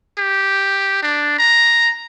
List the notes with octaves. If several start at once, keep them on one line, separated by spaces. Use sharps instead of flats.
G4
D4
A#5